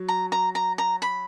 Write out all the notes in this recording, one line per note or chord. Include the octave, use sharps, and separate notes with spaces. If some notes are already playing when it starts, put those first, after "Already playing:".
Already playing: F#3
A#5
A#5
A#5
A#5
B5